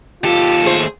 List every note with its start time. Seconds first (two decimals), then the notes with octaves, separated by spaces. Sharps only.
0.24 D#2 F4 G4 A4
0.63 A3 G#4 C5